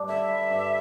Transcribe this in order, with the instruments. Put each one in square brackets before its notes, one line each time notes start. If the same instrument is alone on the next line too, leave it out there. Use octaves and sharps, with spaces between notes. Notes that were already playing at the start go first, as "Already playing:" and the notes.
Already playing: [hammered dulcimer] G2 G3 D4
[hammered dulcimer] D3 [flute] E5
[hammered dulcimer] G3
G2